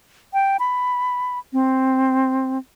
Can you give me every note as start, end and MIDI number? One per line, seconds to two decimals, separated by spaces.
0.34 0.57 79
0.60 1.39 83
1.53 2.58 60